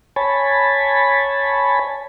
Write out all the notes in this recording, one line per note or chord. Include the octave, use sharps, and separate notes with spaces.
C#5 G#5 A5 B5